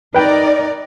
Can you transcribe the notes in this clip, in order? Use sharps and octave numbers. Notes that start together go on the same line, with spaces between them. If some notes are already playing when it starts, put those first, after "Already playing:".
D#4 A#4 B4 D5 G5